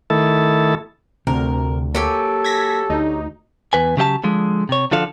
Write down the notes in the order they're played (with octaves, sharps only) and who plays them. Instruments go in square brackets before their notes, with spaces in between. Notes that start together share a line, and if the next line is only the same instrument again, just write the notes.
[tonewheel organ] D#3 A3 E4 A4
[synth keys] D2 [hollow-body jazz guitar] C3 [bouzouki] A#4
[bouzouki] F#3 G4 G#5 [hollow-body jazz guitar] A#3 [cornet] A4
[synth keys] G#6 A#6 B6
D2 D#4
[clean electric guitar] E2 B4 G#5
C#3 F#3 G4 D#5 A5
D3 F3 G#3
C3 C#5
D3 F3 D4 A4 F5